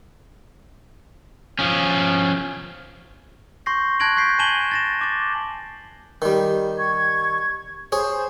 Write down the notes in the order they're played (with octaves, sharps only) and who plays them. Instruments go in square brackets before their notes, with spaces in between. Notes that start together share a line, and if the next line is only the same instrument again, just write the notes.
[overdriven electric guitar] F3 C#4
[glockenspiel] C6 C#6 G6 A#6 C7
A5 F#6 G#6 A#6 D7 F#7
C#6 G6 B6 C7 D7
G#5 A5 D#7 E7 F#7 G7
A6 A#6 E7
D6 A6
[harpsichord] D#3 G3
[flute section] C#6 G#6
[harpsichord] G#4 C#5 [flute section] C5